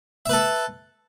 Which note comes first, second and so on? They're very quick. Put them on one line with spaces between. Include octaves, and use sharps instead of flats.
E5 B4 A4